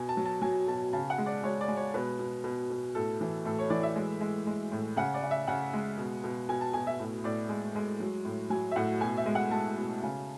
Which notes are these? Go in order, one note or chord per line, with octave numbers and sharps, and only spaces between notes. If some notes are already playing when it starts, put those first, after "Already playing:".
Already playing: B2 G#5
A5
F#3
A5
F#3 G#5
B2 A5
C#3 A5
F#5
G#3
D5
G#3 C#5
D5
G#3
C#5
B2 B4
B2
B2
B2
A2 A4
E3
A2 A4
C#5
E3 D5
E5
G#3
G#3
G#3
A2
C#3 F#5
D5
C#3
E5
C#3 F#5
G#3
B2
B2
B2 G#5
A5
B2 G#5
E5
A2
A2 D5
G#3
G#3
F#3
A2
F#3 G#5
E5
A2 F#5
B2 G#5
E5
G#3
F#5
G#3 A5
B2
C#3